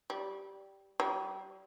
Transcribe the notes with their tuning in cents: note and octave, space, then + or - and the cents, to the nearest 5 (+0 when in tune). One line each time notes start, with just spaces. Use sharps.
G3 -5
G3 -35